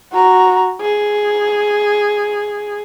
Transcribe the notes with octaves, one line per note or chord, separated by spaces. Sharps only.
F#4 A#5
G#4